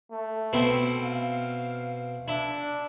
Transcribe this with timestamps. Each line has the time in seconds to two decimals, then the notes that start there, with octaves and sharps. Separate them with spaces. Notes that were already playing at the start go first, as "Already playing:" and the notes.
0.11 A3
0.53 B2 C4 E4
1.04 F5
2.28 D4 E4